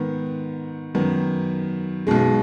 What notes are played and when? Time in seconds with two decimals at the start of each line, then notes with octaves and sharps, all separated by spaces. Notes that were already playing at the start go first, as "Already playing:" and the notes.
Already playing: G#2 D#3 B3
0.95 F#2 D#3 B3
2.07 B1 B2 G#3